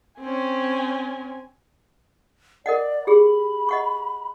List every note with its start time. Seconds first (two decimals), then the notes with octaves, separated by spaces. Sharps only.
0.21 C4 C#4 G#5
2.66 A#4 D5 D#5 F#5
3.07 G4 G#4 B5
3.69 D#5 F#5 C#6